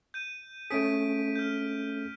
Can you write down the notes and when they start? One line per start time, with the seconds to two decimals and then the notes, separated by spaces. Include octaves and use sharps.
0.14 G6 D#7
0.70 A3 C#4 G#4 B6 D7 D#7
1.36 F6 G6